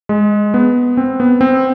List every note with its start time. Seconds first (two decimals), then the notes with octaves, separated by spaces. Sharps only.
0.09 G#3
0.54 B3
0.97 C4
1.20 B3
1.41 C4